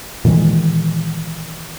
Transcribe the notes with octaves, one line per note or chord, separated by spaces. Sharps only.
A#2 D#3 E3 G#3